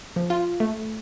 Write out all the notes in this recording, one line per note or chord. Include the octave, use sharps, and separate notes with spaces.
F3
F4
A3